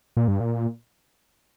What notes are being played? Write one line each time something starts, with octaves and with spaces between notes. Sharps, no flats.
A#2
G2
A#2